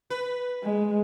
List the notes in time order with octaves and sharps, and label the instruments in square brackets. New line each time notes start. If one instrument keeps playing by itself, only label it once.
[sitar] B4
[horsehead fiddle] G#3